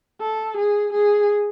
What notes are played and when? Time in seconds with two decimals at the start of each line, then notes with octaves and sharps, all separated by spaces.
0.21 A4
0.57 G#4
0.93 G#4